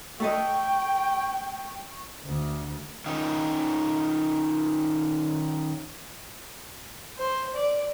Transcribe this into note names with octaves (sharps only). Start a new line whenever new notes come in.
A3 A4 D#5 G5 C#6
D2
D#3 C#4 D#4
C5
D5